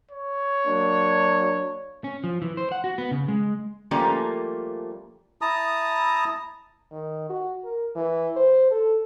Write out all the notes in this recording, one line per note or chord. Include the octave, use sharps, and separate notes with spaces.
C#5
F#3 A#3 D4
C#4
F3
E3
C5
F#5
F#4
B3
C#3
G#3
F3 G3 A3 A#3 C#4
E4 A5 A#5 D#6
D#3
F#4
A#4
E3
C5
A4